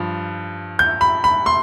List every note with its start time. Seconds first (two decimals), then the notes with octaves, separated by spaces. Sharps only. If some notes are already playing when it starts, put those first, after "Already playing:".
Already playing: G2 F3
0.79 G6
1.01 B5
1.24 B5
1.46 C6